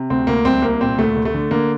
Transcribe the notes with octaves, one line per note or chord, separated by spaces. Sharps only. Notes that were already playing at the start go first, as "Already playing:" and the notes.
Already playing: C3
D2 C4
D2 A#3
C2 C4
C2 A#3
A#2 C4
D2 A3
D2
A3
D3
D3 A#3